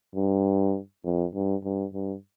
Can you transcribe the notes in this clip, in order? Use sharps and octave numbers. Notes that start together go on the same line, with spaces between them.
G2
F2
G2
G2
G2